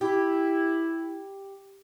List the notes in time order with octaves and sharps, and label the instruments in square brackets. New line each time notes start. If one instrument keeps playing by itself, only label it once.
[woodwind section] E4 [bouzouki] G4